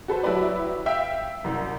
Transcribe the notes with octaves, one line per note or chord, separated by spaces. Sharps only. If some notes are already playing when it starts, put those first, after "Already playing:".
F#4 A4 B4 C5
F#3 E4 F#4 G4 B4 D5
E5 F5 G5 E6
C2 F#2